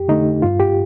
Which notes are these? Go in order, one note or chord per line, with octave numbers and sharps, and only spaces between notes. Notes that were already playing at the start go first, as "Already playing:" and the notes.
Already playing: F2 G4
D3 A3 D#4
G2 F4
G4